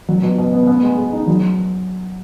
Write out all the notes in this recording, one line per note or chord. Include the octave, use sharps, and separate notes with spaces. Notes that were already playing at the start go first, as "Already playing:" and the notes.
F#3
B2
B2
B3
B3
G#3
G#4
D#4
F#3